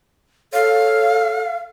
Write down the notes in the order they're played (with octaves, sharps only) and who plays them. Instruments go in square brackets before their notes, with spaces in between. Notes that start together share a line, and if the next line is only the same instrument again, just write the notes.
[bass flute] A4 [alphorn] C#5 [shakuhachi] F5